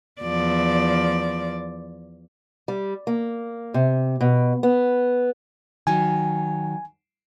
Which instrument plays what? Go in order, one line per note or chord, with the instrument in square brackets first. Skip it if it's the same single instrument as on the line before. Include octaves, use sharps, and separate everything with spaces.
[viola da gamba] E2 F3 D5
[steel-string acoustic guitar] G3
A#3
C3
B2
B3
[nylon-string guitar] D#3 F#3 [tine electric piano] G#5